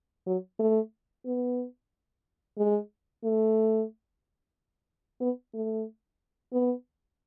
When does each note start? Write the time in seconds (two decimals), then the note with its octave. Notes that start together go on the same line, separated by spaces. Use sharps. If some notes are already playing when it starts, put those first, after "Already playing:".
0.26 F#3
0.59 A3
1.26 B3
2.58 G#3
3.24 A3
5.21 B3
5.54 A3
6.53 B3